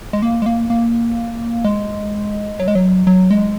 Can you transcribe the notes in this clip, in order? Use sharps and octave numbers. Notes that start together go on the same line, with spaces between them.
G#3
A#3
G#3
A#3
A#3
G#3
F#3
G#3
F#3
F#3
G#3